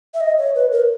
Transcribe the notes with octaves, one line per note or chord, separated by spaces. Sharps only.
E5
D#5
C#5
B4
A#4